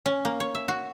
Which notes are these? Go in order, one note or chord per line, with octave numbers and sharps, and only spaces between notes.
C#4
A#3
C#5
E5
F#4